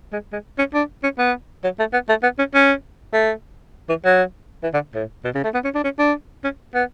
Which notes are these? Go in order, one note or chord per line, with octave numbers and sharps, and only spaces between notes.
G#3
G#3
C#4
D4
C#4
B3
F#3
A3
B3
A3
B3
C#4
C#4
A3
E3
F#3
E3
D3
A2
B2
C#3
A3
B3
C#4
D4
C#4
D4
C#4
B3